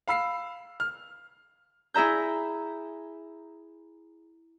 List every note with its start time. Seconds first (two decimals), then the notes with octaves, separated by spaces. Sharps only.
0.08 F5 B5 E6 C7
0.80 F6
1.94 E4 G#4 E5 A#5 G6